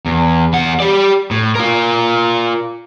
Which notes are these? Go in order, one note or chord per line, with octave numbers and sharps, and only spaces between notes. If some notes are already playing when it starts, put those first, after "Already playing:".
E2
E2 F#5
G4 D5
A2
F4 A#4